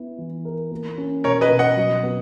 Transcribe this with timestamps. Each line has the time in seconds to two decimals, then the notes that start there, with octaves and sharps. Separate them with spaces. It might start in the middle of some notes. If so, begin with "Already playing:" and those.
Already playing: B3 E4
0.18 E3
0.45 A#4
0.71 A#3
0.98 C#4
1.24 B2 A#4 C#5
1.41 B4 D#5
1.51 B2
1.59 D#5 F#5
1.77 F#3
2.03 B3